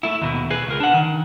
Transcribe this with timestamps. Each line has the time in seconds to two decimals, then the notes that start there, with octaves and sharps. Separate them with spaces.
0.03 A3 E4
0.21 D#2 B2
0.51 G#4 B4
0.67 C#2 A#4
0.80 D4 F#5
0.94 D#3